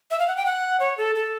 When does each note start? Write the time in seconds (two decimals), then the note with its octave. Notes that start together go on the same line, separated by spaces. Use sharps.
0.11 E5
0.19 F5
0.28 F#5
0.37 G5
0.46 F#5
0.80 C#5
0.98 A4
1.15 A4